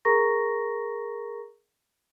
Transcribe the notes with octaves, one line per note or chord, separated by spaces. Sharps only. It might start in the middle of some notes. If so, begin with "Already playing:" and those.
G#4 A#4 A#5 C#6 A#6